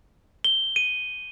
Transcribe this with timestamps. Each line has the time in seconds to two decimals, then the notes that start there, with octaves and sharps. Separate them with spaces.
0.44 G7
0.76 D#7